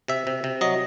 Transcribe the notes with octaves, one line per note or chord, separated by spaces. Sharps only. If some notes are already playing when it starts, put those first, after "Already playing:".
C3 E5
C3
C3
F#3 D#5